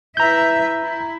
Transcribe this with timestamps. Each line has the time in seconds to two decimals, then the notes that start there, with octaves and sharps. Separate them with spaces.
0.17 E4 B4 E5 A#5 G6
0.85 E4